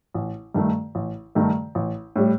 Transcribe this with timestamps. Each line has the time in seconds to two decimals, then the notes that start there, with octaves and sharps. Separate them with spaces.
0.14 A1
0.54 G2 D#3 A3
0.95 A1
1.35 G2 D#3 A3
1.75 A1
2.16 A2 G3